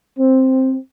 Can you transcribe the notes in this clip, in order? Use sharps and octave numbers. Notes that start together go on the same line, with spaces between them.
C4